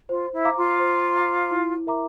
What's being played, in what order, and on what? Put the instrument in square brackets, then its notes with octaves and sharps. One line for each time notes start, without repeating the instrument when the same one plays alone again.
[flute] F4 [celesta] C5
[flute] E4
[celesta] F5 A#5 D6
[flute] F4
[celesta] C5
F5 A#5 D6
E4
A#4 E5 A#5 D6